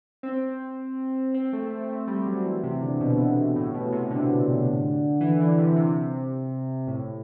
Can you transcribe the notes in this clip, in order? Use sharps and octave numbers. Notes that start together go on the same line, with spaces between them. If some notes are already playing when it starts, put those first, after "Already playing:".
C4
C4
A3
A3
A3
G3
F#3
E3
C3
D3
B2
D3
A2
B2
C3
D3
E3
D3
C3
C3
A2